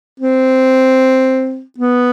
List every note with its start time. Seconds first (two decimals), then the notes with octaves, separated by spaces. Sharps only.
0.20 C4
1.78 B3